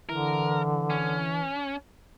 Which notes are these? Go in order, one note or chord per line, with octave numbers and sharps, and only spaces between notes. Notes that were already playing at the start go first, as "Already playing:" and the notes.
D3 E3 A#4
C#4